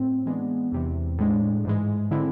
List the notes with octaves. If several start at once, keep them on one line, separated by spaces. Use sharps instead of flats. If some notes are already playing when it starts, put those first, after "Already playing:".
Already playing: A2 C4
E3 G#3 B3 D4
E2 C3 E3
A2 G#3 D4
G#2 E3 G#3
D3 G#3 C4 E4